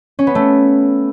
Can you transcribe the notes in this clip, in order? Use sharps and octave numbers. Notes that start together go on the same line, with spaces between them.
C#4
B3
A3